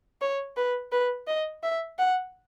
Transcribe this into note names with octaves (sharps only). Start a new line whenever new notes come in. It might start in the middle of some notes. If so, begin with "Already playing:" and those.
C#5
B4
B4
D#5
E5
F#5